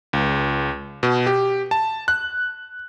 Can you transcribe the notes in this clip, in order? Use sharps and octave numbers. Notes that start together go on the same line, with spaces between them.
C#2
B2
G4
A5
F#6